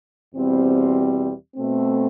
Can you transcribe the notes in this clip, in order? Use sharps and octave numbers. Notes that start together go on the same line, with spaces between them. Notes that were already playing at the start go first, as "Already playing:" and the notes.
E2 B2 G3 C4
B2 A3 C4